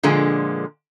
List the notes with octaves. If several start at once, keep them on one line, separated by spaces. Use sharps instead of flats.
A#2 D3 F3 G#3